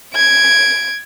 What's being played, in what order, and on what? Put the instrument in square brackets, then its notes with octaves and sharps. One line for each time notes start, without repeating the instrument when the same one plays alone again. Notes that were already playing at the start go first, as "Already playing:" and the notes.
[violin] G#6 D7